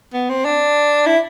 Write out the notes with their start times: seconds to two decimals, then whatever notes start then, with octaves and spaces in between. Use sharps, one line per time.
0.14 B3
0.30 C4
0.45 D4
1.06 E4